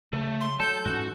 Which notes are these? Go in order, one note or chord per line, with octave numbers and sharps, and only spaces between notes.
C#3 F#3 A3
C6
F#3 A4 A5 G6
G#2 E3 C#4 F#4